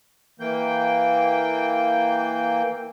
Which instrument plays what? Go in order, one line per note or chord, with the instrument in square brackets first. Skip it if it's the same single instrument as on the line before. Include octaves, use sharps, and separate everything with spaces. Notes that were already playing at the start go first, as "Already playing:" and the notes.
[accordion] E3 A#3 G5